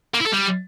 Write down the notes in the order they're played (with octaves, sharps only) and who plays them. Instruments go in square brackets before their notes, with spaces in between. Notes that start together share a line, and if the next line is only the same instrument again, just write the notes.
[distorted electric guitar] A#3
E4
A4
G3